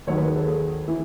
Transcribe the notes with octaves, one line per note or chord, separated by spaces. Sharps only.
D#2 D#3 F#3 C#5
B4
G#4
A4
G#4
E3